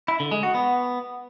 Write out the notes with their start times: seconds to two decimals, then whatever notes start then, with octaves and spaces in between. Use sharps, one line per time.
0.08 E4
0.20 D3
0.31 G#3
0.43 F#4
0.55 B3